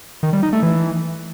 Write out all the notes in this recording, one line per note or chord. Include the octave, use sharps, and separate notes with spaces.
D#3
G3
D#4
A3
E3